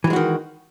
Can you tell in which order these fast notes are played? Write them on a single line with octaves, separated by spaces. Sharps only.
E3 F#3 G#3 F#4 D#3